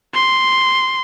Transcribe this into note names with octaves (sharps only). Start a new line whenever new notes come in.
C6